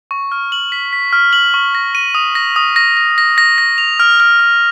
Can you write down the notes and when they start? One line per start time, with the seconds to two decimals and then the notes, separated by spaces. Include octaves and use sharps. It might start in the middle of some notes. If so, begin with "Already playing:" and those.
0.11 C#6
0.32 F6
0.52 F#7
0.72 B6
0.93 B6
1.13 F6
1.33 F#7
1.54 C#6
1.75 A#6
1.95 D#7
2.15 D#6
2.35 A#6
2.56 D#6
2.76 A#6
2.97 A#6
3.18 A#6
3.38 A#6
3.58 A#6
3.78 F7
4.00 F6
4.20 F6
4.40 F6